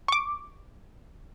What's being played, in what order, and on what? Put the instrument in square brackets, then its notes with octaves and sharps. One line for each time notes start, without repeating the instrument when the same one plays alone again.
[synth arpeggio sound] C#6 D6